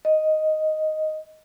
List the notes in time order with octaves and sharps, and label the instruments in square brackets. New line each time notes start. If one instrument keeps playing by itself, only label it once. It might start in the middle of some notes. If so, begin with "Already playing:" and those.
[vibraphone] D#5